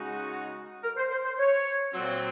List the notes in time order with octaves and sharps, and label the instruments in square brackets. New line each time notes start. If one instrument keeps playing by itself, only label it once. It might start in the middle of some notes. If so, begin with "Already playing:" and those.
Already playing: [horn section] C#3 G#3 D#4 F#4
[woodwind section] A#4
C5
C5
C5
C#5
[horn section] A#2 F#3 C4